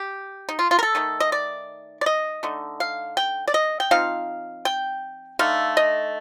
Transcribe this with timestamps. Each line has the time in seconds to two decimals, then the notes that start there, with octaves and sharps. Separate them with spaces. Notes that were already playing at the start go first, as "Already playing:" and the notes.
Already playing: G4
0.49 D#4
0.59 F4
0.71 F4
0.79 A#4
0.83 A4
0.95 D#3 A3 D#4
1.20 D#5
1.32 D5
2.01 D5
2.06 D#5
2.43 D3 A3 D#4
2.80 F5
3.17 G5
3.48 D5
3.54 D#5
3.80 G5
3.91 F3 C4 D#4 F5
4.65 G5
5.39 D3 A3 D#4 F5
5.77 D#5